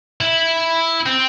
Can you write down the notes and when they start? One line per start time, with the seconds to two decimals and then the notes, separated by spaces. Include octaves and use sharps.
0.21 E4
1.06 C4